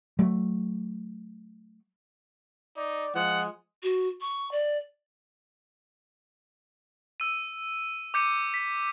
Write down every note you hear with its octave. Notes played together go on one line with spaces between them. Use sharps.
F#3 A3
D#4 D5
F3 G#3 F#5
F#4
C#6
D5
E6 D#7
D6 G6 C#7 D#7
B6